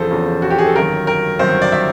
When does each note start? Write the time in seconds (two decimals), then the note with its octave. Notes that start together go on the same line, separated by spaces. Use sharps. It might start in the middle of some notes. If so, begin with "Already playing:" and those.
Already playing: E2 C#3 F3 A4 C5
0.10 E2 C#3 F3
0.42 F#4
0.50 G4
0.58 G#4
0.67 A4
0.75 G1 F#2 D#3 A#4
1.07 A#4
1.39 G1 F#2 D#3 C5
1.62 D5
1.72 E5